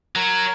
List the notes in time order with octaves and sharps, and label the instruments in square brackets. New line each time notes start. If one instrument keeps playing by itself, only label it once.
[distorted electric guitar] F#3 [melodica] A#4